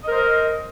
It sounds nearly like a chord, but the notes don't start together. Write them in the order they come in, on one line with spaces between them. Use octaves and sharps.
D#5 A#4 C5